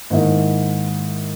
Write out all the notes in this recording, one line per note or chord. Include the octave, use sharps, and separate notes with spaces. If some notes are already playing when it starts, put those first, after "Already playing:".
G#2 D#3 A#3 E4